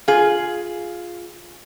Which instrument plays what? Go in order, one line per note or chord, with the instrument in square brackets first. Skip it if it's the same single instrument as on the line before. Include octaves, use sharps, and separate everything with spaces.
[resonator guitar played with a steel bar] F4 G#4